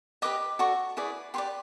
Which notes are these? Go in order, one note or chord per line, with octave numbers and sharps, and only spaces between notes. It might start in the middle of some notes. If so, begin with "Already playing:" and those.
G4 B4 D#5 D6
F#4 A4 D5 C#6
E4 G#4 B4 D5
G4 B4 D5 C6